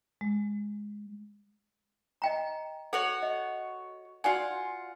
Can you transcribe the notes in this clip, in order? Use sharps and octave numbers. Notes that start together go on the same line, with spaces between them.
G#3
D#5 G5 A#5
F#4 A4 C#5 F#5
D#5
F4 F#4 D5 F#5 G#5